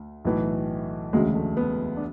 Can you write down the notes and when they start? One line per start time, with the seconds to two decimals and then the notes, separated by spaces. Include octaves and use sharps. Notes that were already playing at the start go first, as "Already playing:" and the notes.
Already playing: D2
0.25 B1 A2 E3
1.13 E1 D2 C#3 F#3 G#3
1.35 A3
1.57 B3
1.97 D4